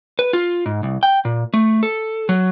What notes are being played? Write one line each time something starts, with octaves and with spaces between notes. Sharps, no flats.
B4
F4
G#2
C2
G5
A#2
A3
A4
F#3